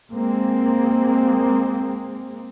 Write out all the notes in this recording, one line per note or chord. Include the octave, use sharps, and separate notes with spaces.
G#3 A#3 C4